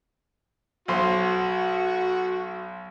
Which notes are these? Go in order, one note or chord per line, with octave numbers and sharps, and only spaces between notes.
B1 F#4 C5